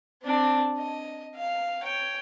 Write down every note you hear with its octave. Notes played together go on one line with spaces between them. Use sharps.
C4 D4
D#5
F5
C#5 G5